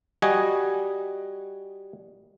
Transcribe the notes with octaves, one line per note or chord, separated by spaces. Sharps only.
G3 F#4 D#5 G#5